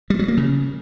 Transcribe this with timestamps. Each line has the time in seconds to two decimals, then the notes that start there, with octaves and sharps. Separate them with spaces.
0.10 G3
0.19 F#3
0.28 A#3
0.37 C#3